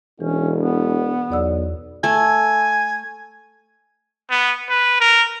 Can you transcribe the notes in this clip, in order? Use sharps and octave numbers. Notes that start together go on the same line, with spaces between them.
E1 E3 C#4 D4
B3
B1 E2 D5 E6
A3 G#5
B3
B4
A#4